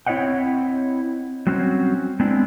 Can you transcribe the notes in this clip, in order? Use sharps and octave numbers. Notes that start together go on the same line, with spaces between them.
C4 E4 C#5 D#5 F#5 G5
F#3 G3 C4 C#4 F#4
G#3 B3 C4 D4 E4